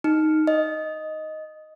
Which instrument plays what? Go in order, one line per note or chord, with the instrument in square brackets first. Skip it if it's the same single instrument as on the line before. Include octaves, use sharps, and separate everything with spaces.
[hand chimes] D#4
D#5